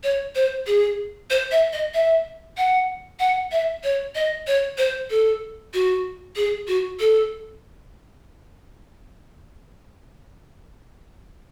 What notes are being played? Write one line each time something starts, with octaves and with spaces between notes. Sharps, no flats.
C#5
C5
G#4
C5
E5
D#5
E5
F#5
F#5
E5
C#5
D#5
C#5
C5
A4
F#4
G#4
F#4
A4